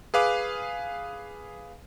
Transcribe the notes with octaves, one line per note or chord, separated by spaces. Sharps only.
G#4 B4 F5 D6